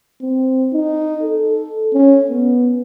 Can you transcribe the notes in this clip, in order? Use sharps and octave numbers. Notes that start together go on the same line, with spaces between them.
C4
D#4
A4
C#4
B3